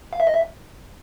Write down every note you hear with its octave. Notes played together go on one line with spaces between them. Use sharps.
F5
E5
D#5
E5